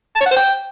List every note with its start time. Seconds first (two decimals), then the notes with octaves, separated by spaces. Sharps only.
0.16 A5
0.21 C#5
0.26 F#5
0.31 C5
0.36 G5